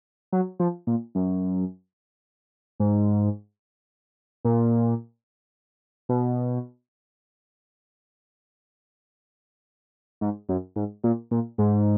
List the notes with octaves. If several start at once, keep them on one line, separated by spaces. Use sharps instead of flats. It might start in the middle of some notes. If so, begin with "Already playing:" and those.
F#3
F3
A#2
F#2
G#2
A#2
B2
G#2
F#2
G#2
A#2
A#2
G#2